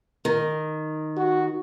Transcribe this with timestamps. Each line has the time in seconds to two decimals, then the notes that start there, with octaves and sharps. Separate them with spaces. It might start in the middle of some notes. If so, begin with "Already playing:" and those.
0.25 D#3
1.17 F#4